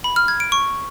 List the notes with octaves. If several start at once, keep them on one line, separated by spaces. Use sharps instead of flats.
B5
F6
G#6
D7
C#6